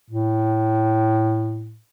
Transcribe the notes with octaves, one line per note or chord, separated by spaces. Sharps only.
A2